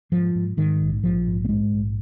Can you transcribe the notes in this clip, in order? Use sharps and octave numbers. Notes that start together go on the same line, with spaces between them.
G#2 F3
G#2
G#2 D#3
A#1
A#1 F3
G#2
A#3
G#2 G#3
A#1